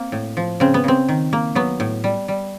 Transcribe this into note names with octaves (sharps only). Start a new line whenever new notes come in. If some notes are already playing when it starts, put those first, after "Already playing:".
Already playing: A#3 C4
A2
F3
C#3 C4
B3
C#3 C4
D#3
A#3
F#3 B3
A2
G3
G3